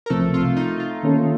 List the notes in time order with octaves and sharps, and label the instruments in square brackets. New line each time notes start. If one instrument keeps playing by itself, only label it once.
[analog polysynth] A#4
[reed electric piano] C2 C3 F3 C4 [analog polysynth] A3 A4
[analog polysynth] F4
D#4
F4
[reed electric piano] D#3 A#3 C#4 A4